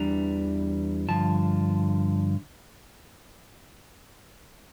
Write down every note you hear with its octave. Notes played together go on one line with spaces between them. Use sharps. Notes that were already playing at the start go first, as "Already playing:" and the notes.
Already playing: E2 E3 G3 D4 A#5
G2 D3 F3 A5